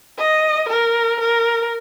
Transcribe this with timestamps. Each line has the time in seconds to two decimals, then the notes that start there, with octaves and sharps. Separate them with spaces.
0.19 D#5
0.69 A#4
1.20 A#4